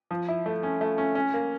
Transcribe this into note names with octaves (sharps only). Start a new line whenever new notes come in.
F3
E4
A3
C#4
A3
C#4
C#4
A#3